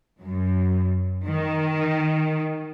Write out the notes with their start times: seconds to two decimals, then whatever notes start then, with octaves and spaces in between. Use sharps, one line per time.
0.22 F#2
1.26 D#3